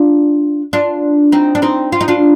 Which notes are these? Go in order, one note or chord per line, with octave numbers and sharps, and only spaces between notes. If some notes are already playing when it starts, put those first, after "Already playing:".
Already playing: D4 F4
D4 F4
C4 D#4
D4
C4 D#4
F4
D#4
D4 F4